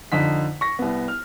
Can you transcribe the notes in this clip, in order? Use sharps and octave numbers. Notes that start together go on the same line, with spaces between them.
F2 D3 D#4 B6
C#6 A#6
C2 B3
F6